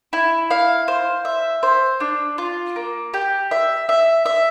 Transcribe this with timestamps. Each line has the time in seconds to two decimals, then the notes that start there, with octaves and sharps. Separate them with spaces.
0.13 E4
0.51 F5
0.88 C5
1.25 E5
1.63 C5
2.00 D4
2.38 F4
2.76 A#3
3.14 G4
3.51 E5
3.89 E5
4.26 E5